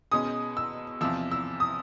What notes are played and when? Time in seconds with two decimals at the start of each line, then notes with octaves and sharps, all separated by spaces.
0.12 B2 G#3 C#4 D#6
0.57 E6
1.01 E2 C3 F3 E6
1.32 E6
1.60 D#6